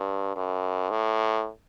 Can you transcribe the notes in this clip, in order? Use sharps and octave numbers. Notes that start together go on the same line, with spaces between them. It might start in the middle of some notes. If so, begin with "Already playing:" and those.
Already playing: G2
F#2
A2